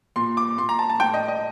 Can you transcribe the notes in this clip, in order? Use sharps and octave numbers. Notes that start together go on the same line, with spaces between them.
A#2 C6
D6
A#2 C6
A#5
A5
A5
A2 G5
D#5
D#5